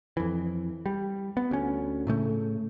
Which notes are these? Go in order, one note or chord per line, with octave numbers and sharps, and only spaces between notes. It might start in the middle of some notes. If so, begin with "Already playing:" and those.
F2 E3
G3
B3
D2 C#4
A2 C#3 A3